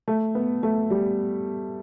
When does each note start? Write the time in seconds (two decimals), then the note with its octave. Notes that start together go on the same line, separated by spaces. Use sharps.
0.08 A3
0.35 B3
0.63 A3
0.90 G3